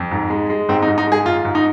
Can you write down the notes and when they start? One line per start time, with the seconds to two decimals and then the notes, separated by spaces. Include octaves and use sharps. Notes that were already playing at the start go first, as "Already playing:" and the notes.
Already playing: F2
0.11 G#2
0.30 G#3
0.50 G#3
0.69 G#2 C4
0.82 D#4
0.88 G#2
0.98 D#4
1.07 G#3 G#4
1.26 G#2 F4
1.45 G#2
1.55 D#4